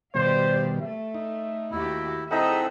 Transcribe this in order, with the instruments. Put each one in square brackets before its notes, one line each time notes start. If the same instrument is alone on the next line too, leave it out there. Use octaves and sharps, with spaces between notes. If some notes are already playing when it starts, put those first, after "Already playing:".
[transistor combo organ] B2 D#3 G3 [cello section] G4 D5 F5 [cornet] C5
[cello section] A3 [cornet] E5
[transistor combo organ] D#4
[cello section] D#2 F#4 G4 [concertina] E4
[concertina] C4 A4 [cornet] D#4 [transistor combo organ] E4 D#5 F#5 [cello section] G#4 E5